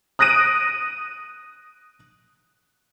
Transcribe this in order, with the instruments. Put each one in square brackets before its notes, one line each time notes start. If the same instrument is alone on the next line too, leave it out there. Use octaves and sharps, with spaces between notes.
[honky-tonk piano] D#6 F#6 A#6 D7 D#7